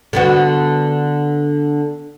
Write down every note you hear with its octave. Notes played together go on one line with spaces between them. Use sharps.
D3 B3 F#4